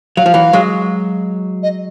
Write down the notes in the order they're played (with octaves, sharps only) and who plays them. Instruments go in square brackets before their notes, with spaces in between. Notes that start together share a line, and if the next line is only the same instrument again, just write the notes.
[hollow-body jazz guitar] F#3 [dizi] F5
[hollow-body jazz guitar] F3
E3 F#3
F#3 G#3
[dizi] D#5